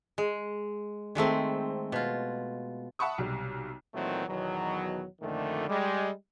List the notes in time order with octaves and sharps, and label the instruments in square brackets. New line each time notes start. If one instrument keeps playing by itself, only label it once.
[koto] G#3
D#3 G#3 A3 C4
B2 F4
[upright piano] E5 F#5 A5 B5 C#6 D#6
B1 C3 G3
[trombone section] A#2 D#3 E3 F#3 A3 C4
E2 B2 D#3 F#3
F2 A#2 D3 D#3 A3
G3 G#3 G4